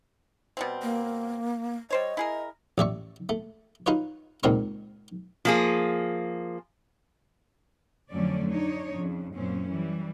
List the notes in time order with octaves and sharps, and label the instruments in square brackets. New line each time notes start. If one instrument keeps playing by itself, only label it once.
[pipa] B2 G3 C4
[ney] A#3
[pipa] G3 C5 C#5 [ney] D#5
[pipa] E4 G#4 A#4
[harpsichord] A1 D5 E5 C#6
A3
D#4 F4 B4 C#5
C#2 A#2 C4 D#4 A#4 C#6
[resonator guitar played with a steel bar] F3 A#3 G#4
[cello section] F2 D3 F#3 A3 C#4 D5
D4 D#4 C#5
F2 C#3
F#2 A#2 C4 C#4
E3 G3